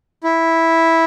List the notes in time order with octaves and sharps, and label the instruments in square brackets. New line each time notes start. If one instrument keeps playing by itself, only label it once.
[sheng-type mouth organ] E4